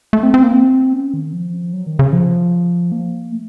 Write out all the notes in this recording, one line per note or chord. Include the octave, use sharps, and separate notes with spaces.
A3
C4
C4
A#3
C4
C#4
D#3
F3
F#3
D#3
C#3
F3
A#3
A3